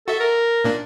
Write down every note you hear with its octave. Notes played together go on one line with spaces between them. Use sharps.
F#4 A4 E5
A#4
A#2 A#3 D4